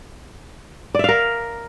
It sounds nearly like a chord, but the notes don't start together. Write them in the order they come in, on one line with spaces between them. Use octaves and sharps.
D5 E5 F5 A#4